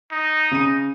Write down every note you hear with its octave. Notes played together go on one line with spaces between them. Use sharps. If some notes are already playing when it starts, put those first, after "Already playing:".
D#4
C#3 D#7